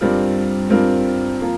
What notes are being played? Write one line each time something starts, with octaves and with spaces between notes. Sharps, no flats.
G2 G3 C4 F4 A#4
G2 G3 C4 F4 A#4
F3 A#3 F4